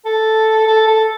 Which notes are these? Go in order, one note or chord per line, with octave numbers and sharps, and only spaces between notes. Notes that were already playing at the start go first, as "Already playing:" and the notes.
A4
A4
A4